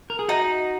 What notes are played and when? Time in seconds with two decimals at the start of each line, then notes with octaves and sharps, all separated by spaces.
0.10 A#4
0.19 G#4
0.28 D#4 F#4